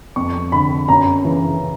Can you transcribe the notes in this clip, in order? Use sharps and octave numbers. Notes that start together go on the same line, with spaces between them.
F2 C#6
D3 B5
F#2 A#5
C#3 E3